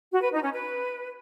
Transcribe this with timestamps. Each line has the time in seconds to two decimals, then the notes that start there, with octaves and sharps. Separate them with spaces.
0.12 F#4
0.22 B4
0.32 D#4
0.42 C#4
0.52 B4